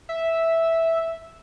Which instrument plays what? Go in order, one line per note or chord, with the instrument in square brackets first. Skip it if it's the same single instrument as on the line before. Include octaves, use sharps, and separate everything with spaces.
[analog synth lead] E5